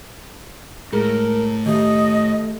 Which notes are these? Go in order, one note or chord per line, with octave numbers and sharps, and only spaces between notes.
A2 G#3 G#4 A#4
D#3 A3 G4 D#5